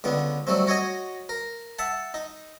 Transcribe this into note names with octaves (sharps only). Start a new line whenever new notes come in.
C#2 D3 B3
F#3 G3 A3 C4
F#4 C#5 D#5 G#5
A#4
E5 F#5 A5
D#4